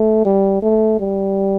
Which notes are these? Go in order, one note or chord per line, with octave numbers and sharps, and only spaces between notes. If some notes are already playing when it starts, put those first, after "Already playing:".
Already playing: A3
G3
A3
G3